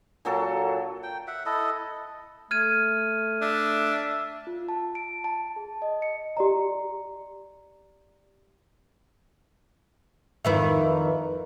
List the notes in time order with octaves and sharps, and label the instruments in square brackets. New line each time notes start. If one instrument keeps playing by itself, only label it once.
[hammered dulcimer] A#2 F#3 A4 A5
[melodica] G5
E5 F#5
E4 A4 D#5
[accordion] A3 [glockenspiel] F6 G#6 D#7
[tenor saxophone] D4 [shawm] E5
[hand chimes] F4
A5
D7
A5
G#4
D#5
C#7
[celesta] G4 D5 A#5
[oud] F2 D#3 E4 [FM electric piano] B4 E5